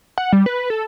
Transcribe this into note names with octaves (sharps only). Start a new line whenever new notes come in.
F#5
G3
B4
A4